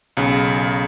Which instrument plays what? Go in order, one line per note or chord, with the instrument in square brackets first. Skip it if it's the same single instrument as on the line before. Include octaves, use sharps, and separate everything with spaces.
[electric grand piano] B1 C#3